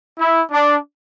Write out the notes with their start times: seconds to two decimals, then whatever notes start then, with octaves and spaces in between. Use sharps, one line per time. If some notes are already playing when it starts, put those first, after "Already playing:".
0.17 E4
0.51 D4